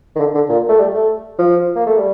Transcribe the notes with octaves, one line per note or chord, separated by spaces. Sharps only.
D#3
D3
D3
A#2
A3
G3
A3
F3
A#3
A3
G3